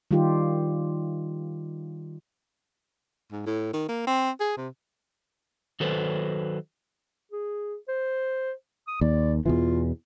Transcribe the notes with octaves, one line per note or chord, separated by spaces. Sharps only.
D#3 G3 D#4 F4 G4
G#2
A2
D#3
A#3
C4
G#4
C3
D#3 F#3 A4 B4 C5
G#4
C5
D#6
D#2 D5
E2 B2 E3 F4